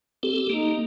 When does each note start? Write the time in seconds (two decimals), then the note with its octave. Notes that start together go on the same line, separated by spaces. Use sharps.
0.23 C4 G4 A4
0.49 A#3 D#4